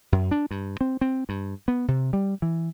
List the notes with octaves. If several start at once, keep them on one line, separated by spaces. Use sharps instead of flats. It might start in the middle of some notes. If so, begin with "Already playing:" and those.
F#2
D4
G2
C4
C4
G2
B3
C3
G3
E3